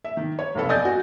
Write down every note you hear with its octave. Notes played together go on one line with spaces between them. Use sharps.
E5
D#3
C#5
F1 B1 B3 A4
D5 D#5 G#5 D#6 G6 A6
F#4